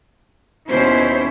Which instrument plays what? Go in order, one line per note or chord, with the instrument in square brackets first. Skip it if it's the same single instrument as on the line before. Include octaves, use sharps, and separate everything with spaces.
[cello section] D#2 B2 C#4 E4 C5